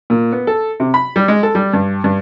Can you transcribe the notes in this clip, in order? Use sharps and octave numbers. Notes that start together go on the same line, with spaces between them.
A#2
B3
A4
C3
B5
G3
G#3
A4
G3
G2
G2